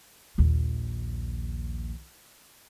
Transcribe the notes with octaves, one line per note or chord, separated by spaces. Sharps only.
A#1 D#2